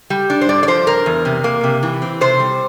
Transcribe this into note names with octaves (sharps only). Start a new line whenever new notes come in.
G3
D4
C5
G2 D5
D5
F3 C5
G2 A#4
E2
C3
A#3
C3
E3
C4
C3 C5
G3